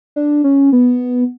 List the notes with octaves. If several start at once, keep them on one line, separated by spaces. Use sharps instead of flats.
D4
C#4
B3